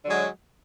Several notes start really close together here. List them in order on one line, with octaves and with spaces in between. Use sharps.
D3 F#3 G#3